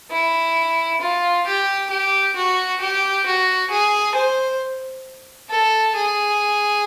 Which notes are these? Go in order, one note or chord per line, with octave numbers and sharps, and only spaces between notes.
E4
F4
G4
G4
F#4
G4
F#4
G#4
C5
A4
G#4